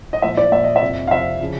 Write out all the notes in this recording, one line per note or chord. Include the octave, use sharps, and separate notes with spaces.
D#5
A#2 F3 E5
D5
A#2 F3 E5
D#5
E5
F2 C3 F3
F5
F2 C3 F3 E5
C#3 F3